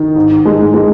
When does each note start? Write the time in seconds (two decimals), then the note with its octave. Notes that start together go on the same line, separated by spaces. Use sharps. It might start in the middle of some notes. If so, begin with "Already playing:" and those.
Already playing: D#3
0.16 G#2
0.45 G#3
0.74 G#3